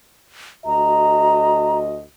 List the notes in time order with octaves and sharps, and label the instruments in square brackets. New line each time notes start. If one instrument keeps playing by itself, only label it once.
[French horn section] D2 F#4 D#5 [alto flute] A#5